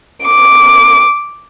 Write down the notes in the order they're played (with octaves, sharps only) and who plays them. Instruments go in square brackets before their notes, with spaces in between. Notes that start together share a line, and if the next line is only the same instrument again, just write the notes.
[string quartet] D6